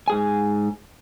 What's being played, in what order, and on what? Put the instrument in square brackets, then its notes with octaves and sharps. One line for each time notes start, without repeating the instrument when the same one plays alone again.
[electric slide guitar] G#2 G#4 G#5